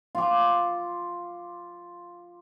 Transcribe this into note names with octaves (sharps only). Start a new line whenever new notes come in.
F4 D6